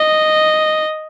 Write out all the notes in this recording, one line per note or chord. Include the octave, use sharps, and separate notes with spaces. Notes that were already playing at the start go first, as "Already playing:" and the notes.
Already playing: D#5